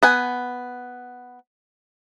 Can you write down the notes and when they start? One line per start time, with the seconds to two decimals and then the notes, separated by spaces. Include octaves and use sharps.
0.03 B3 F#5 G#5